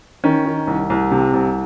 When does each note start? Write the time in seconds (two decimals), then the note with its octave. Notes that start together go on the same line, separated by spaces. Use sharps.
0.24 D#3 C#4
0.46 D#3
0.67 C2
0.90 C2
1.11 C3
1.33 C2